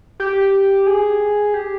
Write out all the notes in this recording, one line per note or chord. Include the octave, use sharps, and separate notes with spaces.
G4
G#4
G4